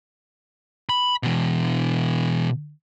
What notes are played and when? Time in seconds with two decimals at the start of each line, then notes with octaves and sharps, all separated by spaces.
0.89 B5
1.23 B2 E3